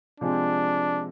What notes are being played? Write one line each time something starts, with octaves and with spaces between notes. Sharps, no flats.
C3 F3 G#3 C4 D4